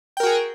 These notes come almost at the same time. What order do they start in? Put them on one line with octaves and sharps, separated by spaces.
G5 A#4 F#4 G#4